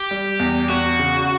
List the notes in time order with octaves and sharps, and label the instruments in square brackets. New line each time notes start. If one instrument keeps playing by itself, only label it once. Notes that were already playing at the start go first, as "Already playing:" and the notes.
Already playing: [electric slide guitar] G4
[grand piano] G3
E2
[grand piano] E2 [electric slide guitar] F#4
[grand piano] C#3